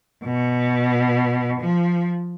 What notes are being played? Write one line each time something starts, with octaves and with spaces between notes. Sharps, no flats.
B2
F3